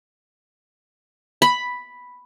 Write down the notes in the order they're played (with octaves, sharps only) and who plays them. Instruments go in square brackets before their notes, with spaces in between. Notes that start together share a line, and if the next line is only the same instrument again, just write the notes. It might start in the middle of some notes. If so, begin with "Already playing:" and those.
[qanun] B5